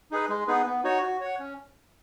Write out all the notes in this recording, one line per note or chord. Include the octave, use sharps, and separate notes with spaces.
D#4 G#4 B4
G#3
B3 D#4 G#4 B4
B3
D#4 F#4 C#5
F#4
C#5 F#5
C#4